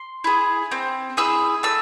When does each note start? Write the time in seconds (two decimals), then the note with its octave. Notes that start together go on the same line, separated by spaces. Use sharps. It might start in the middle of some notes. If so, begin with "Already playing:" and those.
Already playing: C6
0.24 E4 G#4
0.71 C4
1.17 E4 G#4 E6
1.63 A3 E6